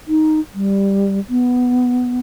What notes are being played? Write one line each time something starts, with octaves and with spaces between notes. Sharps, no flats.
D#4
G3
B3